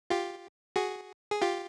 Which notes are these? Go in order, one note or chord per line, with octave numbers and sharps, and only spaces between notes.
F4 G4
F#4 G#4
G#4
F4 G4